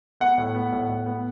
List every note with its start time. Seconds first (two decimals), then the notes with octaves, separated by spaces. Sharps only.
0.20 B3 F#5
0.38 A2
0.55 B3
0.72 A2
0.89 A2
1.06 B3